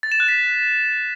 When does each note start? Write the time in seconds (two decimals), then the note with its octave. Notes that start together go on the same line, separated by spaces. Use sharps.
0.03 A6
0.12 E7
0.20 F#6
0.28 B6